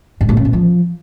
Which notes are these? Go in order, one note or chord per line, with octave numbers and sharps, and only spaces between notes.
G2
A#2
C#3
B2
F3